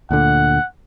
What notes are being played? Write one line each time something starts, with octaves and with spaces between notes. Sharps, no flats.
D2 A#2 D3 F#5